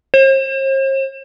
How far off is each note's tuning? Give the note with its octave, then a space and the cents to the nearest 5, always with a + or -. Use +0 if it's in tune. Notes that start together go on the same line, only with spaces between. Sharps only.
C5 +45